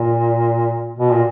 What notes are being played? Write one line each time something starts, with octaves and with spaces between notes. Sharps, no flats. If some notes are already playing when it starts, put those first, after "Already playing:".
Already playing: A#2
B2
A#2